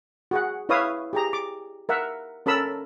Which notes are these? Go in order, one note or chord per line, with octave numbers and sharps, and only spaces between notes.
F#4 G#4 F#5
E4 B4 C#5 E5 F5 D#6
G4 G#4 A#5
D6
A#4 E5 F#5
C#4 A4 A#4 B5 E6